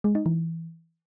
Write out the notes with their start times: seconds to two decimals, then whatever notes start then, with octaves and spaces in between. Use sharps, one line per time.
0.04 G#3
0.15 D#4
0.26 E3